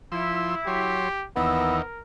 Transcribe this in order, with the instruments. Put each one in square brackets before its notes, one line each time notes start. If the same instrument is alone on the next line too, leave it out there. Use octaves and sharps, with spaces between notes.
[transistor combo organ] F3 C6 E6 [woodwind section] E4
[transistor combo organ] F#3 C#5 C6 [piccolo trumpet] G4
[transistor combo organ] D#2 E3 D#4 [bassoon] B3 [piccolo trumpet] A#4 [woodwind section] E6